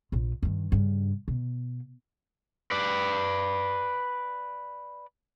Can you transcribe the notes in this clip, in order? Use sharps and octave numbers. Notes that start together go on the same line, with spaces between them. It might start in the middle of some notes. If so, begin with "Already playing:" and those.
A#1 A#2
G2 D#3
G2 C#3
B2
B4 D5